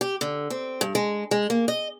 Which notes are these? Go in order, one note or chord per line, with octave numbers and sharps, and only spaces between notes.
G4
D3
C4
G2
G#3
G#3
A#3
D#5